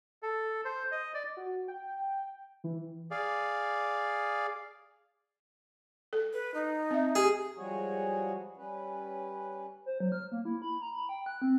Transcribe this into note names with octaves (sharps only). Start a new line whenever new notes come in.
A4
C5
D#5
D5
F#4
G5
E3
G#4 D5 F5
A4
B4
D#4
C4 E5
G4 G#4
F3 G3 G#3 F#4 G#4 C#5
G3 C#4 B4
C5
F#3
F6
A#3
E4
B5
A#5
B5
G5
F#6
C4